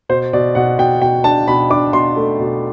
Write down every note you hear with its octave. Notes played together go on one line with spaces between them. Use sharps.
B2 C5
B2 D5
B2 F#5
B2 G5
B2 G5
D4 A5
B2 B5
D4 D6
B2 C6
A3
B2